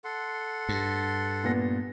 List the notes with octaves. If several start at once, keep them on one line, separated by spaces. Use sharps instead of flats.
A4 F#5 C6
G2
A#2 B3 A#6